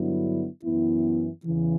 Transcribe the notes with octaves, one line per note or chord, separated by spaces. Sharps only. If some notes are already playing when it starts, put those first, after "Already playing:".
Already playing: G2 D3 F#3 B3 E4
F#2 E3 B3 E4
E2 C#3 E3